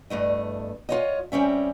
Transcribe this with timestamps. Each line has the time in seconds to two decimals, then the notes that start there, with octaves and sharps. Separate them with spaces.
0.10 E2 G2 A3 D#5
0.89 F4 C#5 D#5
1.32 G3 C4 C#4 E5